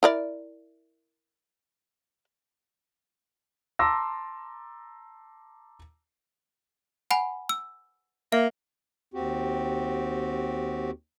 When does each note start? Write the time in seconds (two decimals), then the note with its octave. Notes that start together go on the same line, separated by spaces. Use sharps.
0.03 E4 A#4 D5
3.79 A5 A#5 C6 D6 E6 A#6
7.11 F#5 G#5 B5
7.49 E6
8.32 A#3 E5
9.14 D#2 C4 F#4 G4